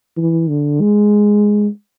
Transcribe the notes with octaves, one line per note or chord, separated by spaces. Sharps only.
E3
D3
G#3